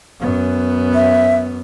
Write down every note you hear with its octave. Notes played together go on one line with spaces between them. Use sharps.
F#2 B3
E5